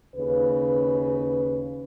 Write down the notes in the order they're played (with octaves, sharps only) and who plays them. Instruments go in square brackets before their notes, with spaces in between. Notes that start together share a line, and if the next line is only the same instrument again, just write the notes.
[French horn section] D#2 C#3 B4